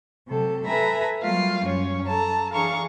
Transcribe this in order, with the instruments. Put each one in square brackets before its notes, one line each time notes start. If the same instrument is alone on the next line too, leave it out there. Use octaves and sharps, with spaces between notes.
[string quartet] C3 F#3 A4
A4 B4 E5 G#5 A#5 B5
F#3 G3 A#3 F4 F5
F#2 C#4 C#5
A4 A5 A#5
E3 D4 G#4 F5 A#5 C#6